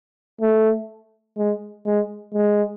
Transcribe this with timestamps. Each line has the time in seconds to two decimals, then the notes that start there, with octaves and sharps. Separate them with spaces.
0.41 A3
1.38 G#3
1.86 G#3
2.34 G#3